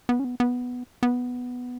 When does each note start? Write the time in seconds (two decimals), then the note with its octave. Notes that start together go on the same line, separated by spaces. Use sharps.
0.09 B3
0.20 C#4
0.24 B3
0.40 B3
1.03 B3